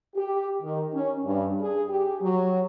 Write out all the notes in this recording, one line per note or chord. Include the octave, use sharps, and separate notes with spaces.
G4
D#3
C#4
G2
G#4
G4
F#3